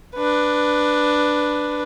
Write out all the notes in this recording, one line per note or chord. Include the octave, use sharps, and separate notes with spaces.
D4 B4